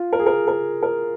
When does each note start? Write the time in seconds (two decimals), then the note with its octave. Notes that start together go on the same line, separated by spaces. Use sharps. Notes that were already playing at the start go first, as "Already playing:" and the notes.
Already playing: F4
0.13 A#4
0.19 G#4
0.26 A#4
0.48 A#4
0.83 A#4